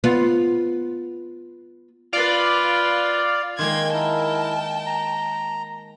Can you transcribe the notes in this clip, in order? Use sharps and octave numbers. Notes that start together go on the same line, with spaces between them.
B3 F4
F4 B4 D5 F5
D#3 G#3 A#3 G5 C6 G#6
E4 A#4 G5 A5
A#5